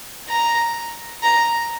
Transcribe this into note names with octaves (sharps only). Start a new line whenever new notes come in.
A#5
A#5